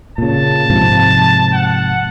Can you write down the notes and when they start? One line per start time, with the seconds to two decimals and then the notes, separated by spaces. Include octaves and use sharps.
0.18 A#2 C#3 A5
0.70 G#2 C3 F3
1.54 F#5